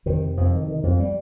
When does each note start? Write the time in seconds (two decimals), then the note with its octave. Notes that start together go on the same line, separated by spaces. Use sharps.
0.06 F2 C3 D#3
0.37 F2 F3
0.53 D#3
0.68 D#3
0.83 F2 F3
1.00 G3